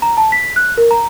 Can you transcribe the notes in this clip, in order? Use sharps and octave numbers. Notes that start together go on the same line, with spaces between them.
A#5
A5
B6
F#6
A#4
A#5